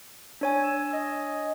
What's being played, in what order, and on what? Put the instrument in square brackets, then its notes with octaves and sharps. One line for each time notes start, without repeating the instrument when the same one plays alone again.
[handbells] D4 C#5 G#5
[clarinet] E6
D#5